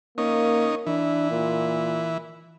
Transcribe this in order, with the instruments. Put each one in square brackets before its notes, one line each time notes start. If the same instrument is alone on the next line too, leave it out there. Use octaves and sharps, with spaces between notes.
[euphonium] A#3 [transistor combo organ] C#4 D#4
[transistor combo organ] E3 [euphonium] D4
[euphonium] A#2